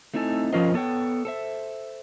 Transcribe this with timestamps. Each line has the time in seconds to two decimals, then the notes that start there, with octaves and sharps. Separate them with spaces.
0.14 A3 C4 D#4 E4 A4 G#5
0.53 F3 C#4 F4 A#4 C5 D#5
0.74 B3 A4 C#5 G5
1.25 A4 C5 E5